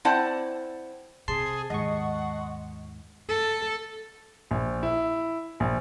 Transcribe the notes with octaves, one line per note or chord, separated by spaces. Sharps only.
C4 E4 C5 D5 F#5 A5
C3 G#4 A5 C6 C7
D#2 G#2 D#5 F#5 C#6
A4
A#1
E4
A#1